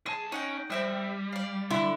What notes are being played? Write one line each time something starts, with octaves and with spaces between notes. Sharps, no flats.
B1 G#4 A5
C#4 D#4 F#5 G5
G3 C4 E5 G5
D5 F5
D3 E4